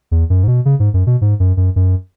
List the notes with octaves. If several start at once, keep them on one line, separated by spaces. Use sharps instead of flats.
E2
F#2
G#2
B2
C#3
G#2
F#2
B2
G#2
F#2
F#2
F#2